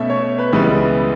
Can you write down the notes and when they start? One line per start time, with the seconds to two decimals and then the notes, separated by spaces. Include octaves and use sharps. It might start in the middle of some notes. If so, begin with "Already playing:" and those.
Already playing: B2 A3 C#4 E5
0.10 C#5
0.38 B4
0.53 C#2 C#3 E3 G3 B3